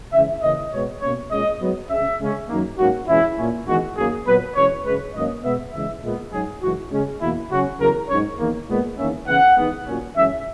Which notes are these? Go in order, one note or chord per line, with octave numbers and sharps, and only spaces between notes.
C#3 E3 G#3 C#4 E5
C#3 E3 A#3 C#4 D#5
B2 G#3 B3 C#5
B2 A#3 C#4 C#5
A#2 G#3 C#4 D#5
G#2 F#3 B3
C#3 G#3 C#4 E5
C#3 G#3 C#4
F#2 D#3 A#3
G#2 F#3 A#3 C#4 F#4
E2 B2 G#3 C#4 E4
A#2 A#3 C#4
E2 D#3 G#3 F#4
F#2 D#3 F#3 A#3 G#4
A#2 F#3 B3 B4
E2 B2 G#3 C#4 C#5
F#2 C#3 G#3 B4
G#2 D#3 F#3 A#3 C#4 D#5
B2 G#3 B3 E5
E2 C#3 G#3 E5
A#2 G#3 B3
G#2 F#3 C#4 G#4
F#2 C#3 E3 G#3 F#4
C#3 G#3 C#4
E2 B2 A#3 E4
C#3 F#3 C#4 F#4
E2 C#3 F#3 A#4
G#2 F#3 C#4 C#5
E2 D#3 A#3
A#2 G#3 B3
E2 D#3 A#3 C#4 E5
C#3 E3 B3 F#5
E2 D#3 G#3 B3
A#2 F#3 A#3 C#4
F#2 E3 G#3 C#4 E5